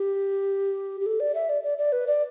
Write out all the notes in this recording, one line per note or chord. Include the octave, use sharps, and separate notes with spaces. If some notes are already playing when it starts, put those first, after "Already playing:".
Already playing: G4
G4
A4
D5
E5
D5
D5
D5
B4
D5